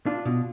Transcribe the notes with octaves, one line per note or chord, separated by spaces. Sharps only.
D4 F4
B2